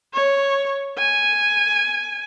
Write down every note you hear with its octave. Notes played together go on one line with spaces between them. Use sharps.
C#5
G#5